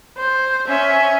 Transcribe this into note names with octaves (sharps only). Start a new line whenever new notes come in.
C5
C#4 E5